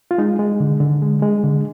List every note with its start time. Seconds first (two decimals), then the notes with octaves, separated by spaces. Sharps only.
0.11 F4
0.18 G#3 D#4
0.39 G#3
0.60 D3
0.80 D3
1.02 G#3
1.22 G#3
1.43 D3